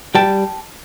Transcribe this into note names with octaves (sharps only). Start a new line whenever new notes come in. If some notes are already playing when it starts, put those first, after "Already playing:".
G3 G5 A5